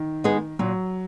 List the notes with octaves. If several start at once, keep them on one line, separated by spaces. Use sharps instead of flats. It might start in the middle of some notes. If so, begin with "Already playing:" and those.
Already playing: D#3
G#3 B3 D#4 G#4
A#2 F#3